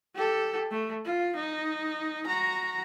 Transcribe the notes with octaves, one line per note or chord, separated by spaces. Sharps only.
G4 A4
A3
F4
D#4
F#4 A#5